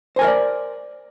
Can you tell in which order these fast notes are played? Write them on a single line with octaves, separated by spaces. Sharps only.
C5 G#5 A#4 D#5 D5